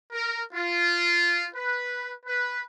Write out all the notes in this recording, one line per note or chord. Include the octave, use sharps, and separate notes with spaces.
A#4
F4
B4
B4